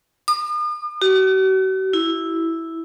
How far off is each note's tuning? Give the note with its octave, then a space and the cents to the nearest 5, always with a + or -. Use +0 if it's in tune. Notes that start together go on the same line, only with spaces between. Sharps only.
D#6 -45
F#4 +45
E4 -5